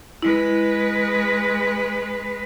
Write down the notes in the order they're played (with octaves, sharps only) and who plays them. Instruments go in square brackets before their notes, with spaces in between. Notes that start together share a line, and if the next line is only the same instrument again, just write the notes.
[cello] G#3 B4 [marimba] E4